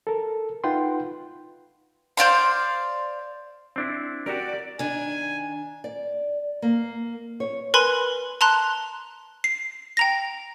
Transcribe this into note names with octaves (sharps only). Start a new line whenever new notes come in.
A4 A#4
D#4 F4 B4 F#5 G5 C6
C5 D5 F5 C6
C4 D4 E4
F#4 G4 A#4 D5
D#3 D4 G#5
D5
A#3
C#5
A#4 B4 G#5 B5 C6
A5 A#5 C6 F#6
C7
G5 A#5 A#6